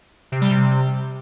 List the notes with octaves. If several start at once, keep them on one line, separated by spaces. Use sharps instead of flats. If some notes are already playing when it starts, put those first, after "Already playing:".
C3
G3
C3